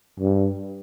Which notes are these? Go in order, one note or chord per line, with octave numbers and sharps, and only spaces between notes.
G2